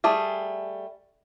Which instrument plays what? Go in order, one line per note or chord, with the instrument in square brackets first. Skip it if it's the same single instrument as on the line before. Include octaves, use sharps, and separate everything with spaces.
[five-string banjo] G3 A3 G#4